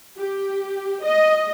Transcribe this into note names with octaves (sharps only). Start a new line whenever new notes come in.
G4
D#5